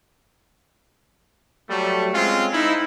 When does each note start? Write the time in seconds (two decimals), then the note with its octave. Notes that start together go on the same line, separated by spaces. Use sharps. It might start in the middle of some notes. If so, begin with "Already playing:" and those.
1.69 F#3 G3 A3
2.14 G#3 C4 C#4 F4
2.53 D#4 E4